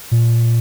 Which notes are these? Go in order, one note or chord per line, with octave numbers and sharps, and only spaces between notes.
A#2